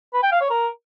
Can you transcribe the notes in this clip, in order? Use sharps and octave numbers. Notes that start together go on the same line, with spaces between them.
B4
G5
F5
C#5
A#4